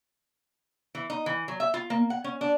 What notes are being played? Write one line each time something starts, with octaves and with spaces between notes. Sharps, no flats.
E3
D#4
E3
F#3
E5
F4
A#3
F#5
C#4
D4